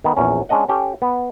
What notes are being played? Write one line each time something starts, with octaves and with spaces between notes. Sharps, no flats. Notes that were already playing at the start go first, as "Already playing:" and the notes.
D#3 B3
A#1 E2 C#4
G#3 C#4 D4 D#5 F#5
C#4 G4 A4
B3